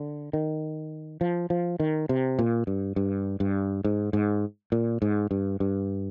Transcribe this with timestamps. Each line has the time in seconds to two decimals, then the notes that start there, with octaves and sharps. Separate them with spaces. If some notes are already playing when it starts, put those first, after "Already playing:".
Already playing: D3
0.33 D#3
1.21 F3
1.50 F3
1.80 D#3
2.09 C3
2.39 A#2
2.67 G2
2.96 G2
3.40 G2
3.85 G#2
4.13 G#2
4.72 A#2
5.02 G#2
5.31 G2
5.60 G2